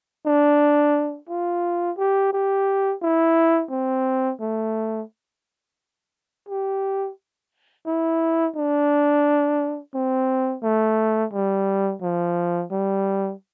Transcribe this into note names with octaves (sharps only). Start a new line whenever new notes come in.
D4
F4
G4
G4
E4
C4
A3
G4
E4
D4
C4
A3
G3
F3
G3